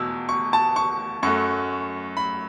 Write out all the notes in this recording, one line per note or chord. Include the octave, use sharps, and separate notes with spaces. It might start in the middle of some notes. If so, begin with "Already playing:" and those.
Already playing: E2 B2 E6
C#6
A5
C#6
F#2 F#3 A3 C#6
B5